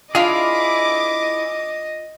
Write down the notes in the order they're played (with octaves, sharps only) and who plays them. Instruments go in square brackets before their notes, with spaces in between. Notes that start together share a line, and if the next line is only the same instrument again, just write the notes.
[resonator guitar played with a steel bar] D4 F4 F5 [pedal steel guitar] E4 G#4 [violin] D#5 [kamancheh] D6